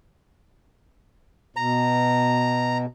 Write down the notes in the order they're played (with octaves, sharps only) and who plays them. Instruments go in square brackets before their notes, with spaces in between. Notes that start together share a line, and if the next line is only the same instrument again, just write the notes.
[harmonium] B2 [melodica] A#5